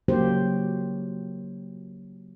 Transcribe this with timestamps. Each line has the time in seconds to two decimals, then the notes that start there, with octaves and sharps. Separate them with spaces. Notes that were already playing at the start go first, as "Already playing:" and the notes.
0.08 C#3 F#3 A#3 D#4 G4 C5